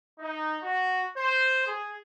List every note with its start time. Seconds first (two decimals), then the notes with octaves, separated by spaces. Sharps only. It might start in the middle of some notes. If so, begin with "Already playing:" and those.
0.17 D#4
0.61 F#4
1.14 C5
1.65 G#4